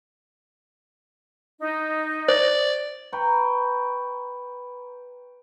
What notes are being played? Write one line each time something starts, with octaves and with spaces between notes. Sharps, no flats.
D#4
C5 D5
B4 G5 A#5 C#6